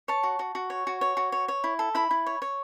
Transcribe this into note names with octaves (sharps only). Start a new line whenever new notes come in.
C#5 A5
F#4
F#4
F#4
C#5
F#4
C#5
F#4
C#5
C#5
E4
A4
E4 B5
E4
C#5
C#5